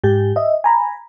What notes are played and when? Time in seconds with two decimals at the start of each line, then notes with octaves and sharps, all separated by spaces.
0.04 G#2 G4
0.36 D#5 E5
0.64 G#5 A#5 B5